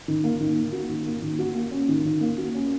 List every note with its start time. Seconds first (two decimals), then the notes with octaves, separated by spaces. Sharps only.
0.08 D#3
0.24 A#3
0.40 D#3
0.57 A#3
0.73 F#4
0.89 D#3
1.06 A#3
1.22 D#3
1.39 F#4
1.55 A#3
1.71 C#4
1.89 D#3
2.05 D#3
2.21 A#3
2.38 F#4
2.54 C#4